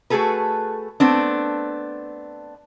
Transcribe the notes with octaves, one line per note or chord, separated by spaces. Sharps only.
A3 F#4 G#4 A4 B4
A3 B3 C4 D4